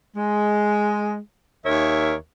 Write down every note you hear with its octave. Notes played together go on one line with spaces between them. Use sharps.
G#3
D#2 A#4 C#5 E5